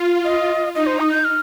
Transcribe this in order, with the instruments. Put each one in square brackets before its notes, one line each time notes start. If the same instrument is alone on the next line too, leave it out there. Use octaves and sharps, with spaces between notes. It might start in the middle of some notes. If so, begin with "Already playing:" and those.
Already playing: [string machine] F4
[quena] D#5
[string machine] D#4 [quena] D#5
[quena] C5
D#6
G6
F6